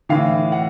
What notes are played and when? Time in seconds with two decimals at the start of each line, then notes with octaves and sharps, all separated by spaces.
0.09 A2 E3 F5
0.52 F#5